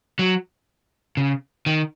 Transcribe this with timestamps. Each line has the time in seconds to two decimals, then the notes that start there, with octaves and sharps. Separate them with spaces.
0.19 F#3
1.17 C#3
1.66 D#3